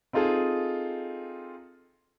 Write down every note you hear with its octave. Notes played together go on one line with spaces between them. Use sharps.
C4 D#4 F4 G#4 A4